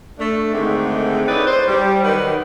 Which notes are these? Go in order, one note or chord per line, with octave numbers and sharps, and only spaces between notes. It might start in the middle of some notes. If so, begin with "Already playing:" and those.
A3 D4
G#2 D3 D#3 G#3 A3 C4
D#4 E4 G#4 B4 C#5 D5
C5
G3
D#3 F#3 B4